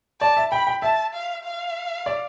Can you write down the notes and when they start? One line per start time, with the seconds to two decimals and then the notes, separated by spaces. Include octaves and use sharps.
0.20 D5 A5
0.37 E5
0.52 G5 B5
0.67 G5
0.82 E5 A5
1.14 F5
1.44 F5
2.06 D5